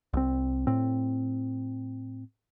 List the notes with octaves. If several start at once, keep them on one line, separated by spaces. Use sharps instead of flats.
C2 C4
A2 C4